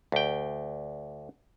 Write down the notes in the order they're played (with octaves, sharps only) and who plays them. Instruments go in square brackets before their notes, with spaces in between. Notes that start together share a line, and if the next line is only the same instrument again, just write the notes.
[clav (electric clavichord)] D2 G5